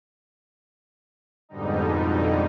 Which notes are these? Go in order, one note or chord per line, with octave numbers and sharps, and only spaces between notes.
F2 G#2 B2 D3 G3 D#4